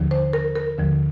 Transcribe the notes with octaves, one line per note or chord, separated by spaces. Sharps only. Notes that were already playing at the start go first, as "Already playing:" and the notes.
Already playing: D#2 D3 F3
C5
A#4
A#4
D#2 D3 F3